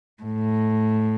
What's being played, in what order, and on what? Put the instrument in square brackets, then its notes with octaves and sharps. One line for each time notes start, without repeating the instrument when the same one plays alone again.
[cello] A2